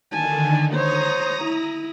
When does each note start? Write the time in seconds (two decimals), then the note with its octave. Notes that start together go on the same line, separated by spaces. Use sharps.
0.12 D3 D#3 G#5 A5
0.73 C5 C#5 A#5 D#6 A#6
1.45 E4